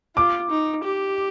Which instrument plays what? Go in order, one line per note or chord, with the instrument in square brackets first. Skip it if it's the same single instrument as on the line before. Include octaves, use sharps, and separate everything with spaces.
[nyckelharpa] F4 [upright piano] D6
[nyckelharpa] D#4
G4